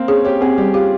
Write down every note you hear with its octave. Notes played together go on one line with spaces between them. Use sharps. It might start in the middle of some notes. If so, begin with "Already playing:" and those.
Already playing: A#3 C4
C#4 G#4
G4 C#5
C4 G#4
G3 G4
F4 G4